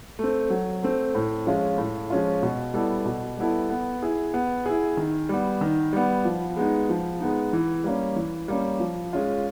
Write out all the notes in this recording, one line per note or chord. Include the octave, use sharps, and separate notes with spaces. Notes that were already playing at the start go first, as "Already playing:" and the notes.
A3 C4
F#3
A3 C4
A2
F3 G#3 C#4 F4
A2
F3 G#3 C#4 F4
B2
G3 B3 E4 A4
B2
G3 B3 E4 A4
B3
E4 G#4
B3
E4 G#4
D#3
G3 B3
D#3
G3 B3
F3
G#3 B3 D#4
F3
G#3 B3 D#4
E3
G3 A#3 C#4
E3
G3 A#3 C#4
F3
G#3 C#4 F4